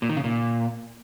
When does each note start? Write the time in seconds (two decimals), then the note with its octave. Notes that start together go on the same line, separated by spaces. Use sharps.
0.02 A#2
0.09 D#3
0.17 C#3
0.24 A#2